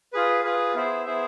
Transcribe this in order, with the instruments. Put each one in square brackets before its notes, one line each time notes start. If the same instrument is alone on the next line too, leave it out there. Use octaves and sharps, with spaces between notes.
[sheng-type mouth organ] F4 G#4 B4
F4 G#4 B4
B3 E4 G#4 C5 E5
B3 E4 G#4 C5 E5